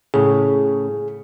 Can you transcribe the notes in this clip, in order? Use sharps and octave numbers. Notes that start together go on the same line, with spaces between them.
A2 C#3 G#4